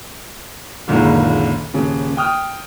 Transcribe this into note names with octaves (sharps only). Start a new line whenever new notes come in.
F#1 C#2 A#2 D3 D#3
D#1 C#3
G5 D#6 F6